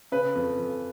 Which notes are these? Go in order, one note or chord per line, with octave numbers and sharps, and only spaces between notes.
C#3 B4
F2
F2